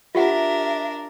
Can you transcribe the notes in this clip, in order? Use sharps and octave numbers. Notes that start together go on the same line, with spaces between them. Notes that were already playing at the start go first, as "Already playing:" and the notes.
D4 F4 G4 A#4 E5 F#5